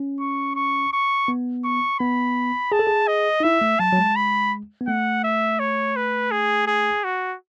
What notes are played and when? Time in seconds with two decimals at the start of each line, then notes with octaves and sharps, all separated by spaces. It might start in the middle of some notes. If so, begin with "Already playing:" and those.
Already playing: C#4
0.20 C#6
0.56 C#6
0.93 C#6
1.28 B3
1.65 C#6
2.00 B3 B5
2.72 G#4 A5
2.79 A4
2.87 G#4
3.08 D#5
3.40 D#4
3.43 E4 E5
3.61 A3
3.79 F#3 A5
3.93 F#3
3.98 G#3
4.16 B5
4.81 B3
4.87 A3 F#5
5.24 E5
5.59 C#5
5.96 B4
6.31 G#4
6.67 G#4
7.04 F#4